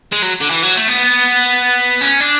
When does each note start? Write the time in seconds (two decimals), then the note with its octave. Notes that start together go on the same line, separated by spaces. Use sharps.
0.12 G#3
0.22 F#3
0.41 D3
0.51 E3
0.63 F#3
0.76 A3
0.88 B3
2.01 C#4
2.21 D4